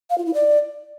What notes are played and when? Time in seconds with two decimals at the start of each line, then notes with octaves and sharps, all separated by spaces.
0.09 F5
0.17 F4
0.25 E4
0.33 D5